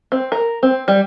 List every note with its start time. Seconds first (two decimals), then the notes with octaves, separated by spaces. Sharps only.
0.12 C4
0.32 A#4
0.63 C4
0.88 G3